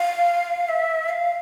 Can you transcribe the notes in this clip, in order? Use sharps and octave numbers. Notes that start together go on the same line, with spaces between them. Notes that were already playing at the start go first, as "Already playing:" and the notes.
Already playing: F5
E5
F5